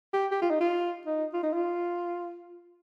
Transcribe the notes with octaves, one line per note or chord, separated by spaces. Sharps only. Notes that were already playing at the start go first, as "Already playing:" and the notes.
G4
G4
F4
D#4
F4
D#4
F4
D#4
F4